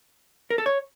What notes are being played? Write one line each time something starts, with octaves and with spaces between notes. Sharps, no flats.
A#4
A4
C#5